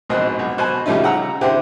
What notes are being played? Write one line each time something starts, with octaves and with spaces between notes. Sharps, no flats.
A#1 G#2 B2 C4 D#5
B1
B2 C5 G#5 A5
C#3 F3 G3 A3 C#4 D#4
F#5 A#5 E6
D3 C4 E4 G4